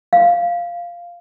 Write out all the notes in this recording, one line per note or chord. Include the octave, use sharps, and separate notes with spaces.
F5